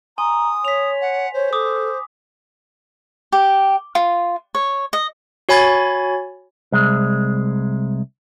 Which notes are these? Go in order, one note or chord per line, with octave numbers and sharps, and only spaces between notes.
G#5 A#5 C6 D#6
C#5 B6 F7
F#5
C5 C#5
A4 D6 D#6
G4
F4
C#5
D#5
F#4 C#5 G#5 B5 G#6 A6
C2 G#3